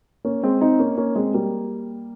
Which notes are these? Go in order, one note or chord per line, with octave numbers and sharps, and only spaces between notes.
A#3 C#4
G#3 C4
C4 D#4
A#3 C#4
A#3 C#4
G#3 C4
G3 A#3